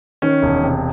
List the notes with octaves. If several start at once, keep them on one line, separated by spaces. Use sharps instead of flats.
D#3 C#4
E1
C3